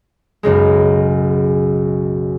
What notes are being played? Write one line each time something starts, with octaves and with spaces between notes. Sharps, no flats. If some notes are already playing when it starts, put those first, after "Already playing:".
B1 F#2 C#3 G#3